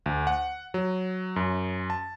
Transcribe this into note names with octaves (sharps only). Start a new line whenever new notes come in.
D2
F#5
F#3
F#2
A5